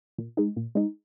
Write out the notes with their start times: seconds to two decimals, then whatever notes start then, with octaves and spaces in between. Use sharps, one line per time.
0.18 A#2
0.37 G#3 D#4
0.56 A#2
0.75 G#3 D#4